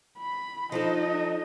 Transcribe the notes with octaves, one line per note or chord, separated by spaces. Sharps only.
B5
F3 D4 D#4 A4 D#5